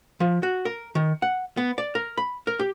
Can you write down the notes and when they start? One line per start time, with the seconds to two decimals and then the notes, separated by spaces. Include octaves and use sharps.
0.20 F3
0.43 F#4
0.65 A#4
0.95 D#3
1.22 F#5
1.57 B3
1.78 D5
1.95 A#4
2.17 B5
2.47 A#4
2.60 G4